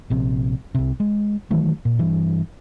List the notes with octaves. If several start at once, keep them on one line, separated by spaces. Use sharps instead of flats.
A#1 C3
C2 C3
G#3
D#3 E3 F#3 A3
A#2
G2 E3